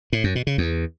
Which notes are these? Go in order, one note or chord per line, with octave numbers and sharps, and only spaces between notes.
A2
F#2
B2
C#3
E2